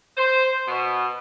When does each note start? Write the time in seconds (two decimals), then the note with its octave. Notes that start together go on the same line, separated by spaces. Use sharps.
0.17 C5
0.68 B2